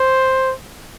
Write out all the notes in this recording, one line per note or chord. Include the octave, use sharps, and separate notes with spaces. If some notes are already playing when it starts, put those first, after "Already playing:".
Already playing: C5